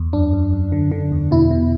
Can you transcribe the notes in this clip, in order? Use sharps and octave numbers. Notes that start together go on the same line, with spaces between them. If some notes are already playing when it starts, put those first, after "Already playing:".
Already playing: E2
F#2 D4
F#2
F#2
D3
D3
E2
B2 E4
B2